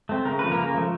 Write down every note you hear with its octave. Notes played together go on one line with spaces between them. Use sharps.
A3 C4
C#3 A#4
F3 A3 B4
A#3 A#4
C#3
F3 A3